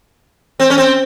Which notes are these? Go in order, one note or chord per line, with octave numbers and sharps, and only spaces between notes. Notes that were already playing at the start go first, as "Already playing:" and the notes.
C4
C#4
C4